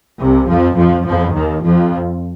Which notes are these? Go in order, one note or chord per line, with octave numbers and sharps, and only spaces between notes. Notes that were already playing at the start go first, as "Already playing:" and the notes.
C2 C3
F2 F3
F2 F3
F2 F3
D#2 D#3
F2 F3